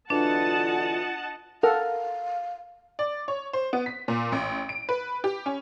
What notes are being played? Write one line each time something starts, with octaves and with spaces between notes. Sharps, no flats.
B2 D3 E3 D4 F4 D#5 F#5 A5
A4 A#4 F5 F#5
D5
C#5
C5
B3
B6
A#2
A1
D7
B4
G4
C#4